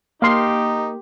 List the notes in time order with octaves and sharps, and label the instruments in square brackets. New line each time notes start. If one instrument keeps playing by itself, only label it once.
[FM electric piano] A#3 [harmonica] D#4 [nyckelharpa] G4 [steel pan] F5 C6